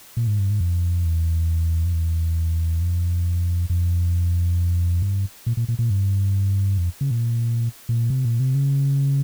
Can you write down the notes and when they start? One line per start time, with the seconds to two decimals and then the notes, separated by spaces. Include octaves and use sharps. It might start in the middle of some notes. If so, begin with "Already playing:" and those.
0.17 A#2
0.27 G#2
0.39 G2
0.50 G#2
0.61 F2
1.05 E2
1.85 F2
1.93 E2
2.81 F2
3.70 F2
5.02 G2
5.46 A#2
5.57 A#2
5.68 A#2
5.79 A#2
5.90 G2
6.78 F2
7.01 C#3
7.11 A#2
7.89 A#2
8.10 C3
8.25 A#2
8.40 C3
8.54 C#3